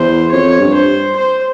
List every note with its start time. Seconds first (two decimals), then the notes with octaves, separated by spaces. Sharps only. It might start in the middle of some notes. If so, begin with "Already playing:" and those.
Already playing: E2 C5
0.32 F2 C#5
0.60 G2
0.74 C5
1.17 C5